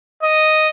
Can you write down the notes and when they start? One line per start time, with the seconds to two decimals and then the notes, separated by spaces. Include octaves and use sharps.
0.23 D#5